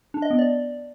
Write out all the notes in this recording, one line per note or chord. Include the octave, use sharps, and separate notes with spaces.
D4
D#5
B3
D5